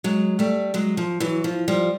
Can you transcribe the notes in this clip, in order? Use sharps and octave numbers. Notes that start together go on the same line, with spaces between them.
F#3 G#3
G3 A3
F#3 G#3
F3
E3 F#3
F3
F3 G3